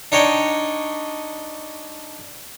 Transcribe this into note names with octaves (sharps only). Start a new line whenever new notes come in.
D4 D#4 C#5 D#5 G5